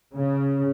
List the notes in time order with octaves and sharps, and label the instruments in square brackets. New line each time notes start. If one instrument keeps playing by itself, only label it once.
[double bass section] C#3